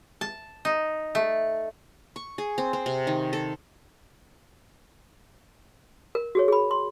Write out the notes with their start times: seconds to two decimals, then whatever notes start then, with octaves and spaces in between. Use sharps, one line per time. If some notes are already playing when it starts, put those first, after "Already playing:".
0.21 A5
0.65 D#4
1.15 A3
2.16 C#6
2.38 G#4
2.58 C4
2.73 C4
2.86 C3
3.07 D#3
3.33 A4
6.15 A#4
6.35 F#4 G#4 C#5
6.48 G#4 B5
6.71 C6